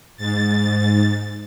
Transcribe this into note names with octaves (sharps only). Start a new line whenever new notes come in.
G#2 A6